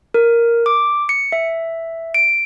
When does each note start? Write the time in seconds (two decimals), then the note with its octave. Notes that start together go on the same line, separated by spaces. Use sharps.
0.14 A#4
0.66 D6
1.09 C#7
1.32 E5
2.14 D7